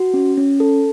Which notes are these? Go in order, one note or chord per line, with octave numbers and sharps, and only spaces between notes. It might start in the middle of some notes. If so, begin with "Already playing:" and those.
Already playing: F#4
C#4
C#4
A4